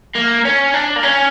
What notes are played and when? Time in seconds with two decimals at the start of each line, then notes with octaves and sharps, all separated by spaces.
0.15 A#3
0.45 C#4
0.74 D4
0.96 A#3
1.03 C#4